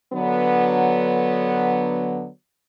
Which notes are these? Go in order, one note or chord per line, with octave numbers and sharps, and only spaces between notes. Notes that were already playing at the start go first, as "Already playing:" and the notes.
D3 F#3 B3